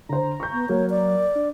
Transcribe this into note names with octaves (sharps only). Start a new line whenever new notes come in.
D3 C5 A#5
C#6 G6
B3
F#3 A#3 C#5
D5
D4